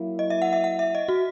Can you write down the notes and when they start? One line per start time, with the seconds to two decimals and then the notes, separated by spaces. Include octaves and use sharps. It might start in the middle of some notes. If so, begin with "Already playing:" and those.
Already playing: F#3 A#3 E4
0.19 D#5
0.30 E5
0.42 F#5
0.53 E5
0.64 F#5
0.79 E5
0.95 D#5
1.09 F#4